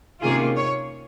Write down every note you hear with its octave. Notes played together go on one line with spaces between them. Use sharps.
C3 D#3 A#3 C#4 F4 G#4
C#5